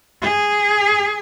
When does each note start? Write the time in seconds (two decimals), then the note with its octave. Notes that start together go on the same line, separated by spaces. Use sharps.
0.22 G#4